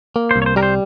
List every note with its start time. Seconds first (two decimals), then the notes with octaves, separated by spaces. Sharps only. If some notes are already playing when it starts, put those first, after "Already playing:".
0.16 A#3
0.31 C5
0.36 C2
0.42 C#5
0.46 C5
0.56 G3 A#4
0.63 C5